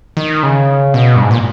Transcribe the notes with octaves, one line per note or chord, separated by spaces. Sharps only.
D#3
C#3
B2
G2
G#2
A#2